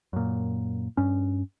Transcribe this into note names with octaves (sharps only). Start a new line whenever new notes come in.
F#2 A#2
G2 C#4